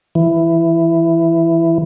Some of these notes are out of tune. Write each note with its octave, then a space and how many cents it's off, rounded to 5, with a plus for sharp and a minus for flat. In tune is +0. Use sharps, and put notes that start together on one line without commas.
E3 +10